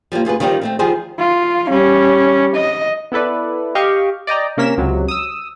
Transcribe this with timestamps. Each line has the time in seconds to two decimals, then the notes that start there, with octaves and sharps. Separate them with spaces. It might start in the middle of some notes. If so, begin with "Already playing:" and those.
0.12 F3 G3 G#3 A#3
0.25 D2 F4 G#4 B4
0.40 D#3 F3 G3 C4 C#4 D#4
0.61 G3 A3 C4
0.79 D#3 F3 G3 G#4 C5
1.19 F4
1.70 G3 C#4
2.56 D#5
3.12 B3 E4 A4 B4 D5
3.75 G4 D#5 F5 C#6
4.27 D5 D#5 G5 A#5
4.57 C3 A#3 C#4 A#4 B6 E7
4.78 C#2 C3 F#3
5.08 D#6 E6